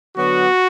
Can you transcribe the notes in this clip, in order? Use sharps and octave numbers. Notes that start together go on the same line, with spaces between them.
D3 F#3 B3 F#4